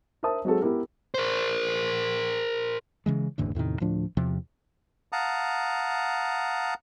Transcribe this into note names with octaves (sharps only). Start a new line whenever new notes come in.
A#4 C5 E5 A5 D#6
F#3 G#3 C4 F#4 G#4 A4
B3 E4 G4 A#4
A#4 C5
C#3 E3 G#3
F#1 E2 A2 D3
E2 A2 C3 D#3
D2 A2 F3 D4
E2 C3 F3
F5 F#5 A5 A#5 D#6